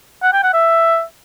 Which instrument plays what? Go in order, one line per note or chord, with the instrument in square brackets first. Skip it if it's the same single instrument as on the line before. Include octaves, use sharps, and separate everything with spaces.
[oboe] F#5
G5
F#5
E5